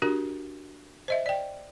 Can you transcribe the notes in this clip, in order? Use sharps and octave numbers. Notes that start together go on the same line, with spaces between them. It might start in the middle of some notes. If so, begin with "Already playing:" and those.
D4 F#4 G4 A#4
C5 D#5 E5
D5 G5